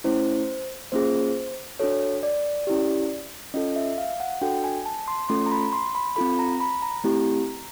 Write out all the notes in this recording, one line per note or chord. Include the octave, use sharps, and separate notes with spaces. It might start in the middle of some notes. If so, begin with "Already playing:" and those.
A3 C#4 E4 C5
A#3 C#4 F4 G#4 C5
D4 F#4 A4 C#5
D5
C#4 E4 G4
C#4 F4 A4 D#5
E5
F5
F#5
D4 F#4 A4 G5
G#5
A5
C6
A3 C#4 F4 A4 C6
A#5
B5
C6
B5
C4 F4 A4 B5
A#5
B5
A#5
A3 C4 E4 G4